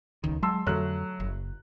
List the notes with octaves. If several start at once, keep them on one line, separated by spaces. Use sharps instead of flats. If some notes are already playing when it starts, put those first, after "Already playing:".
D#1 C#2 D#3
F#3 G#3 A5 C6 E6
F2 D3 F#3 A3 F#6
F#1